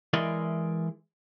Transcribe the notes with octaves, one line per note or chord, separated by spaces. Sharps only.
E3 G#3 E4 A#4 D5 D#5